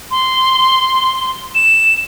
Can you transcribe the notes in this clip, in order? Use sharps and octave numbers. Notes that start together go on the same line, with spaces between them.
C6
E7